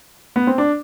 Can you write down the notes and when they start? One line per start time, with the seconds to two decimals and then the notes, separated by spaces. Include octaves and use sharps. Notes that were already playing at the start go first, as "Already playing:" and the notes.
0.36 B3
0.47 C4
0.58 D4